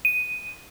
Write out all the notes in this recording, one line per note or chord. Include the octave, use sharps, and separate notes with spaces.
D#7